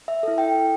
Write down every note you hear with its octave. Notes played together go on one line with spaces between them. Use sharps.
E5
E4 A4
G5